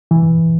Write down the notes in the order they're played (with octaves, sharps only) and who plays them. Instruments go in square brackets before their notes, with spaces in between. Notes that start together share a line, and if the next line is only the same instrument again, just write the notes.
[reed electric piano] E3